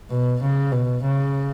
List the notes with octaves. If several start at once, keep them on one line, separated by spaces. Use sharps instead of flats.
B2
C#3
B2
C#3